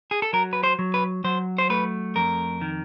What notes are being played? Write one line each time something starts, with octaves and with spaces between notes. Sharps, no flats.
G#4
A4
F#3 A#4
B4
C5
F#3
B4
F#3 C5
C5
A3 B4
F2 A#4
D#3